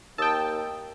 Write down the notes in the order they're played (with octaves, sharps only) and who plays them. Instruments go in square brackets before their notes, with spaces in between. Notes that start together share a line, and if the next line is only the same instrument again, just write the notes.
[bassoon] D#2 [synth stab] G5 A5 [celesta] D#6 E6